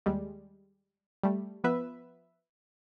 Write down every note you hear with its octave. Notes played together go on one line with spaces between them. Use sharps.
D#2 G3 G#3
G3 A3
F3 B3 B4 E5